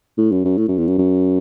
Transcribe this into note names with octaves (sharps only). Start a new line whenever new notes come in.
A2
F#2
F#2
A2
F#2
E2
F#2
F#2